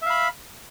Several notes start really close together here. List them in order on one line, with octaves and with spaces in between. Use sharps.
E5 F5 B5